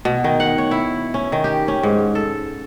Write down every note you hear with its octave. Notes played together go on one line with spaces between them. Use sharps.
B2
D#3
F#5
C#5
E4
C#4
D#3
G4
C#4
G#2
A4